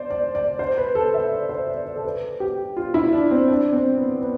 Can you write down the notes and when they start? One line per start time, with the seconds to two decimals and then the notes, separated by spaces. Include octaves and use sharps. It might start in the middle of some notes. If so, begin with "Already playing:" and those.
Already playing: C5 D5
0.10 D5
0.35 D5
0.59 C5
0.78 B4
0.95 A4
1.14 E5
1.32 D5
1.49 C5
1.68 D5
1.86 D5
1.96 A4
2.04 B4
2.40 G4
2.77 F4
2.94 E4
3.13 D4
3.31 C4
3.48 D4
3.73 C4
3.97 B3
4.21 B3